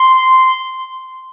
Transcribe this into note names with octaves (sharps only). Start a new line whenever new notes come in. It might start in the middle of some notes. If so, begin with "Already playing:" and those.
Already playing: C6